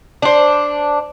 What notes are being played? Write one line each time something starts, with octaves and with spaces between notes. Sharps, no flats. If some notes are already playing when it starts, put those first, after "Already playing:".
D4 C5